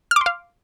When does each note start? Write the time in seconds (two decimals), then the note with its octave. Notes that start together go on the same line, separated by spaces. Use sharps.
0.11 F6
0.16 D6
0.21 C6
0.26 F5